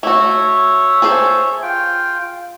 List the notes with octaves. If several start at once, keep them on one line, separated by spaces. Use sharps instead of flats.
A3 F#4 C#5 E5
G#4 A4 C5
F4 G5